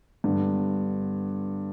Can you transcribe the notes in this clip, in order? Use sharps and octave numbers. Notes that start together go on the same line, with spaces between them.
G2 D3 B3